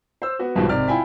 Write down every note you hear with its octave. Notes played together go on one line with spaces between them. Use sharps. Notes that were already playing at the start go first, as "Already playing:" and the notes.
C5 E6
B3 F#4
B1 G#2 B2 D#3 F3 G3
G#1 C3 D5 F6
E4 F4 G5 G#5 B5